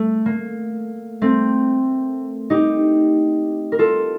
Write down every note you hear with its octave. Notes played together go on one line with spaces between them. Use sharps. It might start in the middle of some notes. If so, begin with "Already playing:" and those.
Already playing: A3
A#3
A3 C4
D#4 G4
A#4
F4 A4